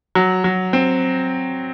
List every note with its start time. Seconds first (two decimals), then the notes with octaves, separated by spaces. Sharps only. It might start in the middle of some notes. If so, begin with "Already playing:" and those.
0.15 F#3
0.44 F#3
0.73 C4